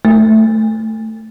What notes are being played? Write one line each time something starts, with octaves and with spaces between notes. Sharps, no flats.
A3